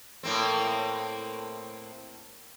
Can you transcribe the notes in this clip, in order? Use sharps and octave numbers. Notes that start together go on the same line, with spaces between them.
A2 A#3 C4